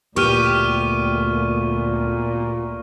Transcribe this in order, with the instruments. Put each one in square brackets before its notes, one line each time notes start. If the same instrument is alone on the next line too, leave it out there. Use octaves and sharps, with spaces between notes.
[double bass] D2 [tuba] A#2 [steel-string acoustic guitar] B3 G4 [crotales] C#6 F6 D#7